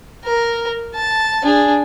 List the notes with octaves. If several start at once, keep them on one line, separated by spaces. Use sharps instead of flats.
A#4
A5
D4 G#4